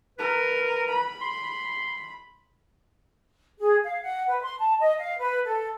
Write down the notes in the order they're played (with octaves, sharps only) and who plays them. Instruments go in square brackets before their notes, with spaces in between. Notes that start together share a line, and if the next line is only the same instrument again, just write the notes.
[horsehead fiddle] A#4 [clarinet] B4
[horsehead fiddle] B5
[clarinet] C6
[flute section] G#4
F5
F#5
B4
C6
A5
D#5
F5
B4
A4